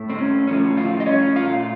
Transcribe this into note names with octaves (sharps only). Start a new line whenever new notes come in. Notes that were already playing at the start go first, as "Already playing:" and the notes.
Already playing: A2 A3
C4
C#4
A2 F3 A3 C#4
F3 F4
D#5
C#4 C#5
A#2 A3 F4 F5